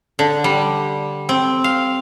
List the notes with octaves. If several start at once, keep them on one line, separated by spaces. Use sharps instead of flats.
D3
G3
C4
F5